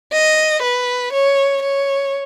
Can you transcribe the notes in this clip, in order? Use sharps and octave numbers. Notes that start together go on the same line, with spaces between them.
D#5
B4
C#5
C#5